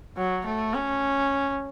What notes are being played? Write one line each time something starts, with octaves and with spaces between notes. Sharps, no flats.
F#3
A3
C#4